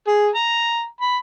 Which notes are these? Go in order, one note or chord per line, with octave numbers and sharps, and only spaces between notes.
G#4
A#5
B5